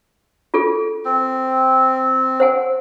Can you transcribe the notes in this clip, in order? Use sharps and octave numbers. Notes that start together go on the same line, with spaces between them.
F4 G#4 A4
C4
C5 F#5 G#5